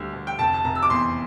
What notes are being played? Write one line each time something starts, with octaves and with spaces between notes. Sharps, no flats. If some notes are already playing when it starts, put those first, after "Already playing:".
Already playing: D2 G3
D2
G5
F1 A5
A5
F1 A#5
E6
D6
E2 C6